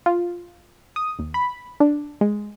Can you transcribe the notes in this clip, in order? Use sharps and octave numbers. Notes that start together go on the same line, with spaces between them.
F4
D#6
D#2
B5
D4
G#3